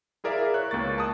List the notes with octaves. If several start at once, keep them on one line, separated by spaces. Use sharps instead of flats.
E4 G#4 A#4 D5 E5 F5
C#5 F#6
C#2 A#3 C#6 A6
A5 D#6